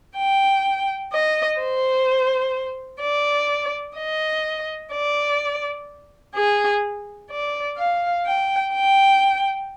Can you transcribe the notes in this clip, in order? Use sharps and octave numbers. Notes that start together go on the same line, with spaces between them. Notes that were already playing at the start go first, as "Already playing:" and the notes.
G5
D#5
C5
D5
D#5
D5
G#4
D5
F5
G5
G5